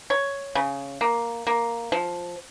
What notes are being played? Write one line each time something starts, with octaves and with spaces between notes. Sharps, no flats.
C#5
C#3
A#3
A#3
F3